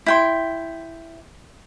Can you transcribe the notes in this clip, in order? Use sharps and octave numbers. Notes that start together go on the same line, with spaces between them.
E4 G5 C6